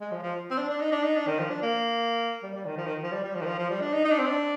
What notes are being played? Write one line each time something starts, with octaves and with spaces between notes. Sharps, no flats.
G#3
F3
F3
C4
D4
D4
D#4
D4
D#4
D4
D#3
F3
D4
A#3
G3
G3
D#3
F3
D#3
F3
G3
G3
F3
D#3
F3
F3
G3
D4
D#4
D#4
D4
C4
D4